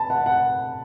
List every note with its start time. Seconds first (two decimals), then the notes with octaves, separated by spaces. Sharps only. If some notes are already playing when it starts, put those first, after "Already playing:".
Already playing: A5 B5
0.10 F#5
0.26 F#5